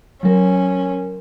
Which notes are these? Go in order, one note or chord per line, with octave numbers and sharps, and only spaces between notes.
F#3 C#4 A#4